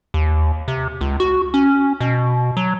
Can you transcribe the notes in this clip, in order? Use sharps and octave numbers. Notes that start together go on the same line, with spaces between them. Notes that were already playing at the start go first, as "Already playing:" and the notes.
D#2
C3
C#2
F#4
C#4
B2
F#3